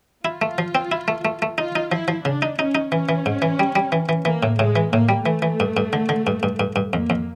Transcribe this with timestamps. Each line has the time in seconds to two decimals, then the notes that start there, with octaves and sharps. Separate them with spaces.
0.25 E4 F4
0.42 A3
0.58 F3
0.75 C4
0.92 E4
1.08 A3
1.25 A3
1.42 A3
1.58 D#4 F4
1.76 D#4
1.92 F3 E4
2.08 F3
2.25 C#3 D4
2.42 D#4
2.59 C#4 D#4
2.75 D#4
2.92 E3 C#4
3.09 E3
3.26 G#2
3.42 E3
3.59 G3
3.76 G3
3.92 E3
4.09 E3
4.25 E3 A#3
4.43 A2
4.59 A2 G#3
4.76 E3
4.92 A2 A#3
5.09 G3
5.25 E3 A3
5.42 E3
5.60 G2
5.77 G2
5.93 D3
6.09 D3
6.27 G2
6.43 G2
6.60 G2
6.76 G2
6.93 F2 A#3
7.10 F2